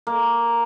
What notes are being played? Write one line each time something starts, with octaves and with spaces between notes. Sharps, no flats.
A#3